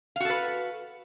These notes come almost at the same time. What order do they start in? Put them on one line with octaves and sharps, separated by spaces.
F5 F#4 A4 B4